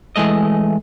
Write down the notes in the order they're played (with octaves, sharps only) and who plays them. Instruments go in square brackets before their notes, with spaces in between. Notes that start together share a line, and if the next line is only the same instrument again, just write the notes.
[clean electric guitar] E3 G#3 A3 D#5